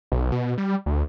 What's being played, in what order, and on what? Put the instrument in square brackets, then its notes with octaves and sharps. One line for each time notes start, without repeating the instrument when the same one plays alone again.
[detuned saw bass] B1
B2
G3
D2